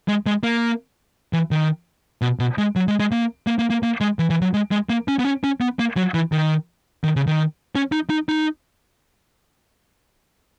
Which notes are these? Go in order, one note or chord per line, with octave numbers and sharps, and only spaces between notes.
G#3
G#3
A#3
E3
D#3
B2
B2
G#3
F#3
G#3
G#3
A#3
A#3
A#3
A#3
A#3
G#3
E3
E3
F#3
G#3
G#3
A#3
C#4
B3
C#4
C#4
B3
A#3
F#3
E3
D#3
D#3
C#3
D#3
C#4
D#4
D#4
D#4